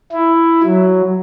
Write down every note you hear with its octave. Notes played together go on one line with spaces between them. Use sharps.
E4
F#3